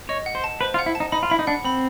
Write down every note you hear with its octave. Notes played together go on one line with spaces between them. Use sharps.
C#5 D#5
F#5
C5
A5
B4 C5
F4
F#5
E4
A5
D#4
D#4 B5
F4
E4 B5
D#4
D4 F#5
C4 B5